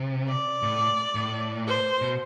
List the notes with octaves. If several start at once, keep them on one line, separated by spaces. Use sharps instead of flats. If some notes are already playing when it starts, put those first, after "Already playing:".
Already playing: C3
D5
A2
A2
C5
B2